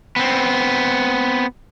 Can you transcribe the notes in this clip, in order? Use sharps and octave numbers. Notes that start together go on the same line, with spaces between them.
B3 C4